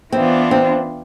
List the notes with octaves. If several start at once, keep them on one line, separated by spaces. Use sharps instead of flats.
E3 B3 C4 D4 F4
C4